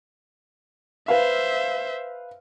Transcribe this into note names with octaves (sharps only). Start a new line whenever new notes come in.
B4 C5 E5 F5